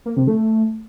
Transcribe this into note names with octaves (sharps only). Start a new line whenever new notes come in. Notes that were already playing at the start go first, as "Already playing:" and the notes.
A#3
C3
A3